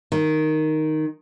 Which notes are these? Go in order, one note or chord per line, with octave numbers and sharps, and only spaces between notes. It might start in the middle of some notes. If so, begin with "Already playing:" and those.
D#3